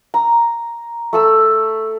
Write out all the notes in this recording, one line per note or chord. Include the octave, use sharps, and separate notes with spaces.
A#5
A3 A4 E6